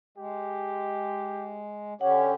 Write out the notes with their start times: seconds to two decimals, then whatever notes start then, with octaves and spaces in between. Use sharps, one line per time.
0.18 G#3 G4
2.01 D3 C#4 G4 C#5 F#5